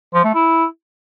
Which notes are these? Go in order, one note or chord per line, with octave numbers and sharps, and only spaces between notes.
F3
A3
E4